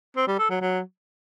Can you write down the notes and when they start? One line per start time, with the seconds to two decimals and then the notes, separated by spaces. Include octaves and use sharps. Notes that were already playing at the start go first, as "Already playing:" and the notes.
0.16 C4
0.28 G3
0.39 A4
0.50 F#3
0.61 F#3